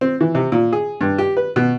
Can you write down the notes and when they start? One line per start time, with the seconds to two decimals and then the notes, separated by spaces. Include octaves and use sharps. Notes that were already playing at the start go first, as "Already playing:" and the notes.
0.01 C4
0.21 E3
0.35 C3
0.52 A#2
0.73 G#4
1.01 G2
1.18 G4
1.37 B4
1.56 B2